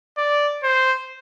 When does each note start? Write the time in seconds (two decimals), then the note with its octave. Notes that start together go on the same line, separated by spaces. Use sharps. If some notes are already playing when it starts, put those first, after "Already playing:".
0.18 D5
0.64 C5